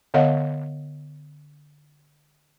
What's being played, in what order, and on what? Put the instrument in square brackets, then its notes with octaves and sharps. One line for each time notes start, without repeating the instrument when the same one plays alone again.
[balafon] D3 B3 C#5 D#5 F5 F#5